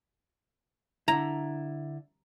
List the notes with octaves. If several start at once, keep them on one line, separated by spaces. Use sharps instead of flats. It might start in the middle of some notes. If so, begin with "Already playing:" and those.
D3 E4 A#5